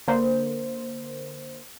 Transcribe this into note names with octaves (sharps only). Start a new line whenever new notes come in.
D3 A#3 C5